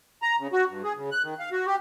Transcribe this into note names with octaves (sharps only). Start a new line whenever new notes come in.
A#5
C#3
F#4
G2
G#4
C#3
F#6
D#3
F5
F#4
G4